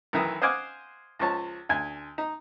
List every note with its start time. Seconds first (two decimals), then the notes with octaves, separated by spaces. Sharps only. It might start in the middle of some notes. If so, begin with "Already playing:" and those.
0.13 B1 D#3 E3 A#4 D#6
0.42 C5 D#5 F5 F#5 G#5 D6
1.19 C#2 F3 C#5 A5
1.69 D2 G#5
2.18 D#4